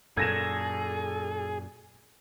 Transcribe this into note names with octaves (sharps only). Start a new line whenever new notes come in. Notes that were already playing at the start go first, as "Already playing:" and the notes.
F#2 A#2 G#4 A4 G#6 A#6 E7